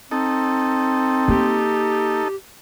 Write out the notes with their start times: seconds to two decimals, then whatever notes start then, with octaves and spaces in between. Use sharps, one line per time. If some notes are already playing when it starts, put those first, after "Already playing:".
0.11 C4 D#4 A4
1.28 A#3 G4